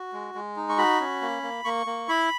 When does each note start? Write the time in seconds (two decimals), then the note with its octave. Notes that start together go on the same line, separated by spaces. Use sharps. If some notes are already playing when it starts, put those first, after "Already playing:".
Already playing: F#4
0.13 G#3
0.35 G#3
0.56 D#4
0.69 C#6
0.78 F#4 B5
1.00 C#4
1.22 A#3
1.43 A#3
1.65 A#3 C#6
1.86 A#3
2.08 E4 B5